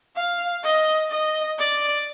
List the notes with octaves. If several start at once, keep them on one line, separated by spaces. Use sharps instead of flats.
F5
D#5
D#5
D5